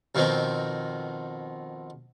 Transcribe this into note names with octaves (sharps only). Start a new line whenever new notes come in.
F2 B2 D#3 B3 C4